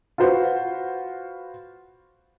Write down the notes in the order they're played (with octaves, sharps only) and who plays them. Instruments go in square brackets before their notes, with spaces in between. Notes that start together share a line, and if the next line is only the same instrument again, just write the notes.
[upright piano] F4 F#4 B4 C5 F#5